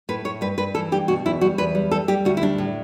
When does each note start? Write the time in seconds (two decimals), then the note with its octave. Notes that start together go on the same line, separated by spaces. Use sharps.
0.09 A2 B4
0.25 A2 C#5
0.41 G2 B4
0.58 G2 B4
0.75 E3 A4
0.92 G2 G4
1.08 B2 F#4
1.25 E2 E4
1.41 G3 F#4
1.58 E2 B4
1.75 G3
1.91 G3 A4
2.08 G3 G4
2.25 D2 F#4
2.37 E4
2.42 G3 D4
2.58 A2